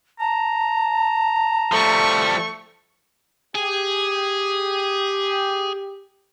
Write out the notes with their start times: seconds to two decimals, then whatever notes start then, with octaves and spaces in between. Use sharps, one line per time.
0.20 A5 A#5
1.72 F3 G3 A3 C#6
3.55 G4 G#4